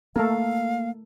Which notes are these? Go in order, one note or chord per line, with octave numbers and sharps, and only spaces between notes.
A3 A#3 A4 A#4 F5